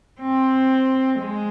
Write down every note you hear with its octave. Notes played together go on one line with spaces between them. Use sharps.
C4
G#3